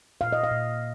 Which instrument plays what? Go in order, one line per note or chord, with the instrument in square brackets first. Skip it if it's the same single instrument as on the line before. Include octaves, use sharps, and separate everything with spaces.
[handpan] A#2 F5
D#5
F5
A#2